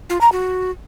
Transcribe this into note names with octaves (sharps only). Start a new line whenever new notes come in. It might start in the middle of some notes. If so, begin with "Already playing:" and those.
F4
A#5
F#4